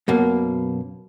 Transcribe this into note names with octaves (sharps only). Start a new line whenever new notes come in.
F#2 B2 A#3